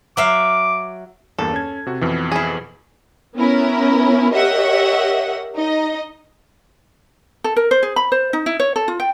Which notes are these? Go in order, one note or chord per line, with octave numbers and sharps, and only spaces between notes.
F#3 E5 F5 D6
E2 G2 A#3 A4
C#4 G#6
C3 F#4
F2 B2 E3
E4 G#4
B3 C#4 E4 A#4
G4 A#4 C#5 D#5 E5 F#5
D#4 D#5
A4
A#4
C5
G#4
B5
C5
D#4
E4
C#5
A4
F4
G5